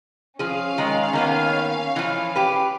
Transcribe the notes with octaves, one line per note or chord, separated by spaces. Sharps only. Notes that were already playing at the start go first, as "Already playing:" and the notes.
F3 C#4 G#4 F5
D#3 G#3
D#3 A#3 B3
E3 F3
G4 B4